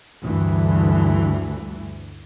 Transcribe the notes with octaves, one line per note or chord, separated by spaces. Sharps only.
D2 G2 E3